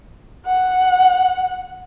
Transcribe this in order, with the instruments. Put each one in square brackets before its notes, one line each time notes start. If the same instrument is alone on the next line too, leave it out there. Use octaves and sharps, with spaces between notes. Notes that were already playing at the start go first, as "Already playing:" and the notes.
[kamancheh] F#5